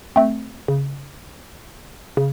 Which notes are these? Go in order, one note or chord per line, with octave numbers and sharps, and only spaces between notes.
A3 C4
C#3
C#3